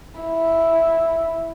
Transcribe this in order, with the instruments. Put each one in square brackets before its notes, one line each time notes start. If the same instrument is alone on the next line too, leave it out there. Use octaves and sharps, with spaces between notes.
[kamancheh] E4